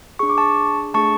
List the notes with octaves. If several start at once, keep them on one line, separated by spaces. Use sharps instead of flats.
D4 G#4 C#6
D6
A5 C#6
A3 D4 G#4 A5 C#6